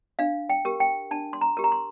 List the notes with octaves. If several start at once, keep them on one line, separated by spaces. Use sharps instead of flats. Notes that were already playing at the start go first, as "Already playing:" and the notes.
D4 F5
G5
G4 A#4
G5
D4 A5
C6
A#5
G4 A#4
A#5
C6